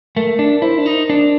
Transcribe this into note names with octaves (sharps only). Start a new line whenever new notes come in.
A3 A#4
D4
E4 C5
D4
D#4
D4